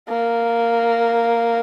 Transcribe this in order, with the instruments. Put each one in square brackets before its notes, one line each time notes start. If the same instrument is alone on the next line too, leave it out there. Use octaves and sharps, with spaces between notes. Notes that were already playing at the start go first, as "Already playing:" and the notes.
[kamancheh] A#3